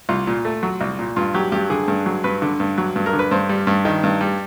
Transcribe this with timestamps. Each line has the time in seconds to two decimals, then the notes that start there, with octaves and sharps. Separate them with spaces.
0.09 C2 F4
0.27 A#2
0.45 A3
0.63 F#3
0.81 C2
0.99 A#2
1.16 G2 F4
1.34 F#3 G4
1.52 G2 G4
1.70 D3 G#4
1.88 G2
2.06 F#3
2.24 G2 B4
2.42 D3
2.60 G2
2.78 F#3
2.96 G2
3.06 A#4
3.13 D3
3.19 B4
3.31 G2 C5
3.49 G3
3.67 G2
3.85 D#3
4.04 G2
4.21 G3